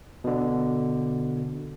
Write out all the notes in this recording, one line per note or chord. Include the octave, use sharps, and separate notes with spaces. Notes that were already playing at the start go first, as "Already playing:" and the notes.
B2 D3